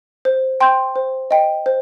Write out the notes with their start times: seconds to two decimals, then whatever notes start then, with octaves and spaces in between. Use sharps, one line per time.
0.25 C5
0.61 G5 C6 G6
0.96 C5
1.31 D#5 G5
1.66 C5